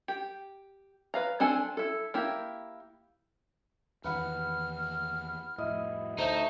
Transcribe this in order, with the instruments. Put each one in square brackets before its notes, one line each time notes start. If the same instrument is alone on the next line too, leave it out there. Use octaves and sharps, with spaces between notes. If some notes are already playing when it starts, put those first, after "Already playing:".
[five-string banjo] G4
B4 F5 A#5
C4 D4 A4 G#5
E4 A4
A#3 E4 G4
[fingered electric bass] E2 D#3 [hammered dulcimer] B4 F#5 B5 [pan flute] F6
[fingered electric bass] F2 A2 [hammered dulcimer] E4 D#5
[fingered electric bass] D2 [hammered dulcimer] A3 C#5 [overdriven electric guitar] D#4 [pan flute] C5